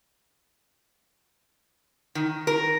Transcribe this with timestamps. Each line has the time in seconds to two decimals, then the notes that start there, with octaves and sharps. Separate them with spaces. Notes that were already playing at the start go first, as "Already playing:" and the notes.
2.15 D#3
2.47 A#4